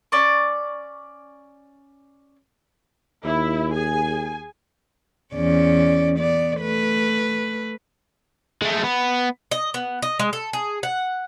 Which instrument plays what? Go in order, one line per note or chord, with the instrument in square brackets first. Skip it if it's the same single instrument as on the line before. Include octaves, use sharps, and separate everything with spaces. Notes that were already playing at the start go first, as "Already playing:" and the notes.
[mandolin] C#4 D5 C#6
[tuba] D#2 [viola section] E4
[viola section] G#4 G#5
[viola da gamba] E2 C#4 D5
B3 D5
A3 B4
[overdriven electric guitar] G#3 A3
B3
[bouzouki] D#5
B3
D#5
G#3
A4
G#4
F#5